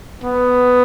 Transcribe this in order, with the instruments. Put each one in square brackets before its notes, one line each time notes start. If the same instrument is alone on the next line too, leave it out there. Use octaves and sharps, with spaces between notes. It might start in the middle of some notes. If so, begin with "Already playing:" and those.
[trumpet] B3